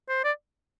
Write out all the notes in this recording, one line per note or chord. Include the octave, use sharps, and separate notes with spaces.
C5
D5